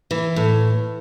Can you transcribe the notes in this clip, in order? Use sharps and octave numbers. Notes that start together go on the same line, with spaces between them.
E3
A2